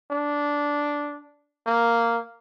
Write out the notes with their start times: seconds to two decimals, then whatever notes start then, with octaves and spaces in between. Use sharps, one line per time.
0.11 D4
1.67 A#3